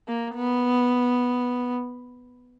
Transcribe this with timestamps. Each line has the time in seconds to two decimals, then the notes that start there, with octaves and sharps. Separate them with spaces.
0.08 A#3
0.35 B3